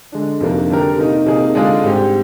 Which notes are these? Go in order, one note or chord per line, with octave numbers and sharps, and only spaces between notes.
D3 G#3 D4
F2 C3 D#3 A#3 D4
D3 G3 D4 G4 A#4
C3 D#3 A#3 D#4
C3 D#3 A#3 D#4 G#4
D3 G#3 D4 F4 G#4
G#2 G3 C4 G4